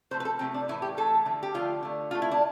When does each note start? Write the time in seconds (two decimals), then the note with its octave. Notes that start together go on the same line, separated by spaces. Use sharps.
0.11 C3 F3 A3 C5
0.20 B4
0.25 A4
0.39 C3 F3 A3 C4
0.54 D4
0.68 A2 E3 A3 E4
0.82 G4
0.97 A2 E3 A3 A4
1.25 D3 F3 A3
1.43 G4
1.54 D3 F3 A3 F4
1.83 D3 A3
2.11 D3 A3 F4
2.22 E4
2.31 D4